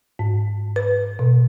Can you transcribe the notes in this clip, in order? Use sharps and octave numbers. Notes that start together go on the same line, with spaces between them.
G#2
B4
B2